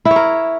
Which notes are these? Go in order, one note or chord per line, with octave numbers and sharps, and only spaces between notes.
E4
C#5
A#4